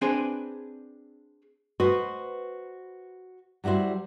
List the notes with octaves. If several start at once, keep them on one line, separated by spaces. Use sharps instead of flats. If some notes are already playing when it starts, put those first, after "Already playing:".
C4 D4 G#4 B4 C5 G#5
F#4 B4 C5 D#5
F#3 G3 E4 F#4 C5